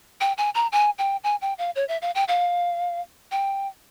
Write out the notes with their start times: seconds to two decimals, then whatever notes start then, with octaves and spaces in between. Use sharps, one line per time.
0.21 G5
0.38 G#5
0.55 A#5
0.72 G#5
0.98 G5
1.24 G#5
1.41 G5
1.58 F5
1.76 C#5
1.88 E5
2.02 F5
2.15 G5
2.28 F5
3.31 G5